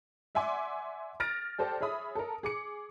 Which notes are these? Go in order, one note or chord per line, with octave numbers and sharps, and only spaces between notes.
D5 E5 F#5 G#5 C6 D6
F6 A6 A#6 D7
G4 A4 C5 D5 A5
G#4 C#5 E5 B5 D#6
A4 A#4
G#4 D6 C#7